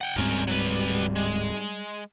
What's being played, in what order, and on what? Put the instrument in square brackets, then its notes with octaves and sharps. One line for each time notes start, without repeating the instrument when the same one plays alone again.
[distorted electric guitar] F#5 G5
[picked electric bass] D1 G#2 C4 [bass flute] G3 [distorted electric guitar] C#4 A#4
[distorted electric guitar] F#3 B4
G#3